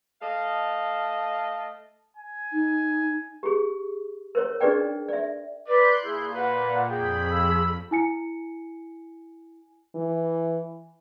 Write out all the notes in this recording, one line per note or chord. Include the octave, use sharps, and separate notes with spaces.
A3 D#5 F5
G#5
D#4
G4 G#4
A#4 C5 C#5
D4 D#4 G#4 B4 D5 G5
D5 E5
B4 D5 C6 F#6 G6
A#2 E4 G#4
B4 F#5
F2 G#4 G5 B5
E6
E4 G#5 C#7
E3